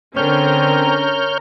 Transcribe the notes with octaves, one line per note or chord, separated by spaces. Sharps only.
D3 C4 C#4 A#4 C#5 A#5 F6 G6